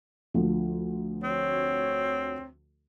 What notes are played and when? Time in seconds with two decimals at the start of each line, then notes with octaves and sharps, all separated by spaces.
0.34 D2 F3
1.24 F2 C4 F#4 C#5